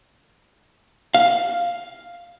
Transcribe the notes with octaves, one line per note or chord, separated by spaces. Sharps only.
F5